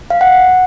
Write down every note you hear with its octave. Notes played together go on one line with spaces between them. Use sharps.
F5
F#5